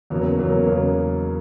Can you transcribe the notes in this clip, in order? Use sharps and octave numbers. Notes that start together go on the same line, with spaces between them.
E2 C#3 F#3 A#3
E2 C#3 F#3 A#3
E2 C#3 F#3 A#3